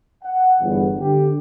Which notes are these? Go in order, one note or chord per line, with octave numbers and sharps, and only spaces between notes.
F#5
G1 E2
D3 D4 G4